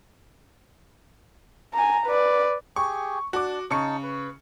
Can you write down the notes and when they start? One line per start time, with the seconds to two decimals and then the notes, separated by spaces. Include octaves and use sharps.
1.74 G#5 A#5
2.07 B4 D5
2.76 G4 G#4 C#6
3.33 D4 F#4 A5 D6
3.71 C#3 D#4 A5 C#6 C#7
4.03 B4